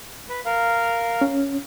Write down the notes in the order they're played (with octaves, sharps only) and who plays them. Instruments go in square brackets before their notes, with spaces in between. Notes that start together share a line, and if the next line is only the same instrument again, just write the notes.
[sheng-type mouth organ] B4
A#4 F5
[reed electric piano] C#4